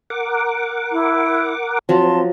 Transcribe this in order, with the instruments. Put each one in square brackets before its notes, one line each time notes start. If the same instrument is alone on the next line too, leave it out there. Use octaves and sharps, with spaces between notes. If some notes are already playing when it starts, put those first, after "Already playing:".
[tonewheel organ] A#4 F#5 D6
[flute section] E4
[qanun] F3 F#3 [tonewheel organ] C4 [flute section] A5 C6